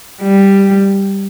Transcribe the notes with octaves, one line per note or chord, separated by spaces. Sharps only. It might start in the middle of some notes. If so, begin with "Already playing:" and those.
G3